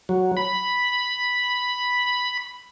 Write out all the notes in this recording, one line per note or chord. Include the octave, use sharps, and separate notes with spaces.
F#3
B5